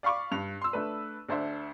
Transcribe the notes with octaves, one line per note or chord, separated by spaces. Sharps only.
D5 F5 B5 C#6 D6
G2 F7
C6 E6
A3 D4 B4
D2 D4 C5 E5